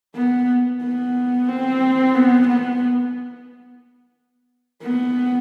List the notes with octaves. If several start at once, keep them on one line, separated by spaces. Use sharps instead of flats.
B3
B3
C4
B3
B3
B3